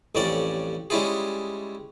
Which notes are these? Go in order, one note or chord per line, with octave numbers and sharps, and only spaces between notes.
A1 F2 G3 C#4 D5
G3 G#3 C#4 E4 F4 G#4